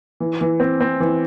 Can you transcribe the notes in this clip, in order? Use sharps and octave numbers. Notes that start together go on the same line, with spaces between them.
E3
E3
C4
C4
E3